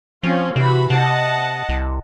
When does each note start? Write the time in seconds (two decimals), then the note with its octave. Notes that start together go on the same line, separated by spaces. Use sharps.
0.23 F3 C4 C#4 F4
0.56 C3 E3 F#4 B5
0.90 C3 D#5 F#5 A5
1.69 C2